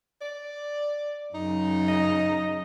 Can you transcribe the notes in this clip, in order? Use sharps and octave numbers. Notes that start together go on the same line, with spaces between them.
D5
F#2 C#3 D#4
D#5